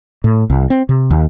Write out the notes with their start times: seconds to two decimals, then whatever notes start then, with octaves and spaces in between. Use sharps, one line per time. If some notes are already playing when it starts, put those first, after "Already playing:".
0.24 A2
0.50 C2
0.70 C4
0.89 C3
1.11 D#2